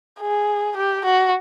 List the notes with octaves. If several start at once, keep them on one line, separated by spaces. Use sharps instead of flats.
G#4
G4
F#4